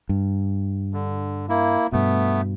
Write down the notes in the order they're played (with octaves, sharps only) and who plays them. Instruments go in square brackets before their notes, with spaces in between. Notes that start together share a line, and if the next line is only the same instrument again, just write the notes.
[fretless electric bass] G2
[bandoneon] D3
A#3 E4
[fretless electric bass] G2 B2 [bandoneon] A3 B3